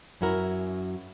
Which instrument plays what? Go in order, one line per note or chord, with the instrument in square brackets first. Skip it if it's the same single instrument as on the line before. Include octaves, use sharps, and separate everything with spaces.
[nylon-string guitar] F#2 C#4 E4 F#4 A#4